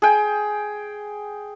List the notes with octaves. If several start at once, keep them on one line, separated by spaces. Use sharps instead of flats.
G#4 G5